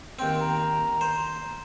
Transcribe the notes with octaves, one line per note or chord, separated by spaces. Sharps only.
D#2 C4 G5
A#5
C5